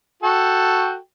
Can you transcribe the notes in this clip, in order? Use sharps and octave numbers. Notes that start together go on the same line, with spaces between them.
F#4 A4 G5